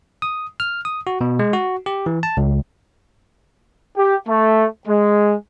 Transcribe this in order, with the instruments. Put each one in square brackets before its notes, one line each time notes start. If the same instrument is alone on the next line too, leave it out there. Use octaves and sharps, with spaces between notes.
[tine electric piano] D#6
F6
D#6
F#4
B2
G#3
F#4
G4
E3
A5
C#2
[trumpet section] G4
A3
G#3